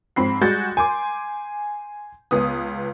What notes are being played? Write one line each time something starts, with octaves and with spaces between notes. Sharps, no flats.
G#2 F3 C4 B5 C7
G3 G#3 F#4 G6 A6 C#7
G#5 C6 D6
C#2 B3 D#6